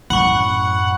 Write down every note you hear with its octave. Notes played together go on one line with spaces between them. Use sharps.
F#2 A2 F#5 B5 C#6